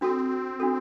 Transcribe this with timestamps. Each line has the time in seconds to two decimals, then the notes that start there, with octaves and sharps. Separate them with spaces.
0.01 C4 D4 F#4 A4
0.60 D4 F#4 A4